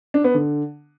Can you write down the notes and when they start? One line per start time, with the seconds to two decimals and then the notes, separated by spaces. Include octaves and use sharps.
0.14 D4
0.24 B3
0.34 D3